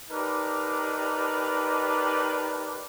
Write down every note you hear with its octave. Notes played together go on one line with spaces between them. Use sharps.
D4 D#4 G4 A#4 B4